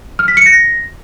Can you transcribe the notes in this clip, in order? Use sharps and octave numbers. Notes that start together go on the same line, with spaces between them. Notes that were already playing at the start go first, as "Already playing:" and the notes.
F6
B6
C#7
A#6